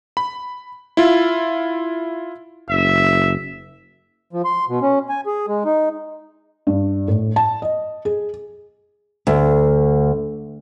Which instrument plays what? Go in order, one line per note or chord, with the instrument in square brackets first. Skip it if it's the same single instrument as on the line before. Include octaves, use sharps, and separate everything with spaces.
[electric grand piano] B5
E4 F4
[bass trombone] F#1 [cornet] E5
[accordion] F3
C6
B2
C#4
G#5
G#4
G#3
D#4
[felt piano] G2
A2
A5
D#5
G#4
[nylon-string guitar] D2